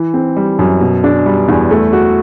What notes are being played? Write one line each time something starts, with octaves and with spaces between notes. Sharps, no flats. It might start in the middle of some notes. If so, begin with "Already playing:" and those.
Already playing: E3
C4
G3
F#2
B2
D4
G3
E2
A3
F#4